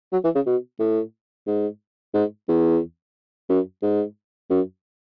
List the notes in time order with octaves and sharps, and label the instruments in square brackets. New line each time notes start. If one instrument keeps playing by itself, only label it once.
[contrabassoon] F#3
E3
C#3
B2
A2
G#2
G#2
E2
F#2
G#2
F#2